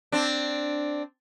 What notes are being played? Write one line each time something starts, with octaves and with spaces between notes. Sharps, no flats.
C4 D4